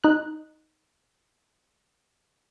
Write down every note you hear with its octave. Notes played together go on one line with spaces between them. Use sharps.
D#4 F#6